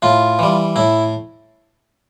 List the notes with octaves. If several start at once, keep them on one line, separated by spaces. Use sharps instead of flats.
A2 F4
E3 G3
A2 E4